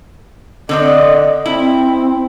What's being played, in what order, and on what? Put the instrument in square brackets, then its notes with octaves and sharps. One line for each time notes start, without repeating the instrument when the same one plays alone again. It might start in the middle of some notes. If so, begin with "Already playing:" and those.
[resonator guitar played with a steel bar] D3 C4 D5 [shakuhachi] D#5
[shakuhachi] C4 [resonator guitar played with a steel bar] E4